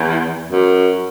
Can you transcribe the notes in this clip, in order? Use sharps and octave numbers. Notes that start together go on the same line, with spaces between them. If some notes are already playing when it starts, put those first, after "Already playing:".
Already playing: E2
F#2